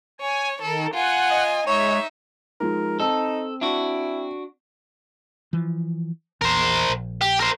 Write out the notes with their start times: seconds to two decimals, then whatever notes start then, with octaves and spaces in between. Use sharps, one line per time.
0.20 C#5 G#5
0.62 D#3 A4 A#4
0.94 F4 F#5 G#5
1.31 D#5
1.67 G#3 D#4 C#5 E5
2.60 F3 G#3 D#4 A#4
3.00 C4 D#4 A4
3.61 D4 E4 F#4
5.53 E3 F3
6.41 A#1 E2 A#4 C5
6.89 A#1
7.21 G4
7.40 A#4 C5